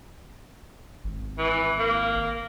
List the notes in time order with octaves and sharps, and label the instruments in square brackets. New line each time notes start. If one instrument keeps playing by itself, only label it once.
[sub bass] G#1
[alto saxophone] E3
A#3